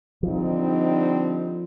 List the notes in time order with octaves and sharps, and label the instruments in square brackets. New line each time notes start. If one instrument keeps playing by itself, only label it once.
[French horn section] D3 G3 C4 D#4 [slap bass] F3